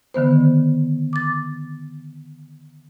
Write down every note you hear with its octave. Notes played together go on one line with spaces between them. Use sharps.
D3 D#3 B3 C5
D6 A6